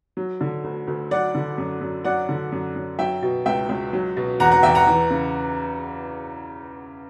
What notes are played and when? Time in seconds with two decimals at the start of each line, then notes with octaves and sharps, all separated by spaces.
0.17 F#3
0.41 D3
0.64 D2
0.87 D2
1.11 F#3 D5 F#5
1.35 D3
1.58 F#2
1.81 F#2
2.05 F#3 D5 F#5
2.29 D3
2.52 F#2
2.76 F#2
2.99 F#3 E5 G5
3.22 B2
3.46 C#2 E5 G5
3.69 C#2
3.93 F#3
4.17 B2
4.40 E2 F#5 A#5
4.51 F#5 A#5
4.63 E2 E5 G5
4.75 F#5 A#5
4.87 E3
5.10 C#3